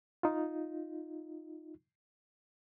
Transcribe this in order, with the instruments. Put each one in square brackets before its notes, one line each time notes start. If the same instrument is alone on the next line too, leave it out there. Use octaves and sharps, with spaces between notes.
[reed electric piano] D#4 F4